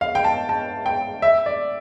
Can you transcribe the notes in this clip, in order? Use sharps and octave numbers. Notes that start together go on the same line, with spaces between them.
F5
G5
A5
A5
G5
E5
D5